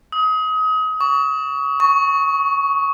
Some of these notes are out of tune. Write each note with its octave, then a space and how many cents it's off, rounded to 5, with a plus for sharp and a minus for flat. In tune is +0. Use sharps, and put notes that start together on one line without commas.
D#6 +30
C#6 +30
C#6 +5